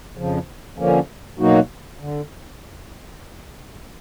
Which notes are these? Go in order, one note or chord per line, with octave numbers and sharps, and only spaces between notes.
F2 C#3 F3
D3 F3 A#3 C#4
B2 F#3 A#3 D#4 F#4
D3